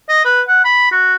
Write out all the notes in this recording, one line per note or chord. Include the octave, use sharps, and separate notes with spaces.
D#5
B4
F#5
B5
F#4